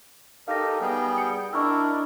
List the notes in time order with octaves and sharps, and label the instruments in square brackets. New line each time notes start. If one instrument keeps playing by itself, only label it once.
[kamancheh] D#4 A4 [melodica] G4 A#4 [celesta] F5 A#6
[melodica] G3 B3 G#4 [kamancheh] G5
[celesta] C#7
[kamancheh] D4 [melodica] E4 A#4 [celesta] D#5 C#6 E6